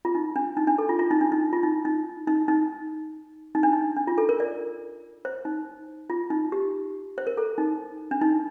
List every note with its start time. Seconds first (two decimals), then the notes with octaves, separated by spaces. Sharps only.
0.05 F4
0.15 D#4
0.36 D4
0.57 D#4
0.67 D4
0.78 A4
0.89 F4
0.99 F4
1.11 D#4
1.21 D4
1.32 D#4
1.53 F4
1.63 D#4
1.85 D#4
2.27 D#4
2.48 D#4
3.55 D#4
3.63 D4
3.73 D#4
3.96 D4
4.07 F4
4.18 A4
4.29 A#4
4.40 D5
5.25 C5
5.45 D#4
6.10 F4
6.30 D#4
6.52 G4
7.18 C5
7.27 A#4
7.37 A4
7.58 D#4
8.11 D4
8.21 D#4